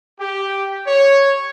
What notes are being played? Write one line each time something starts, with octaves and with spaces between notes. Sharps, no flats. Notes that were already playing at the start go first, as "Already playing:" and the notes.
G4
C#5